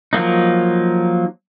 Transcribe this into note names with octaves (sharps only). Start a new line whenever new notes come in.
F3 F#3 A#3 D#4